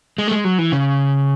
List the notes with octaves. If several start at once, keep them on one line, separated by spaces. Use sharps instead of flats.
G#3
A3
G#3
F#3
E3
C#3